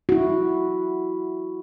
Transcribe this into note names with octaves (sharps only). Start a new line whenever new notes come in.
E4 F#4